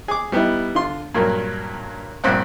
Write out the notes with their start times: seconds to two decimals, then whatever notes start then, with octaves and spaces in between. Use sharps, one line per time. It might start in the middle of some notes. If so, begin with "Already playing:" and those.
0.08 G#4 D6
0.32 G3 B3 D#4 E4
0.75 D3 F4 C6
1.15 G2 A#2 F#3 A#4
2.24 A#1 G2 C4 F#5